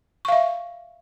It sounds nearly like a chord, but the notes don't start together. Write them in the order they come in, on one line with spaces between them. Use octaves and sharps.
C#6 F5 E5